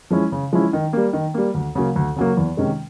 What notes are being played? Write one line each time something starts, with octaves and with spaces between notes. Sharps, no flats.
F3 G#3 C#4 E4
C#3
F3 G#3 C#4 E4
D#3
G3 A#3
D#3
G3 A#3
D2
C#3 F#3 A#3
D2
C#3 F#3 A#3
E2
C3 D#3 G#3 C#4